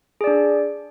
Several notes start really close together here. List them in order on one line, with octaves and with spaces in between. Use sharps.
G#4 D5 D4